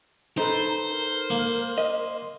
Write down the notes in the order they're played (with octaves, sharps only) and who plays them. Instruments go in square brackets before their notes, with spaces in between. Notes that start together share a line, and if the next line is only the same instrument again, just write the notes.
[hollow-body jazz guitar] D#4 A4 B4 [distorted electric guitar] C5 [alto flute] A#5
[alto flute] A#4
[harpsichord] A#3
[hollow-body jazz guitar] D#5